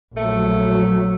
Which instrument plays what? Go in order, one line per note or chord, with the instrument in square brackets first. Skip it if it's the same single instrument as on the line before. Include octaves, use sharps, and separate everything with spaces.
[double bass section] A#1 F#3 [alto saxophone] A3